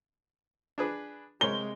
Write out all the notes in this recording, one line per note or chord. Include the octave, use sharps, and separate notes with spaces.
D4 G#4 B4
C3 G#3 A#4 C5 C#5 G7